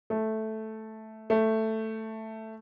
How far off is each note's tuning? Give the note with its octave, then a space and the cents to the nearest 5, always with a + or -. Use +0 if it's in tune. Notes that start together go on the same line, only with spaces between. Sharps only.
A3 -5
A3 +5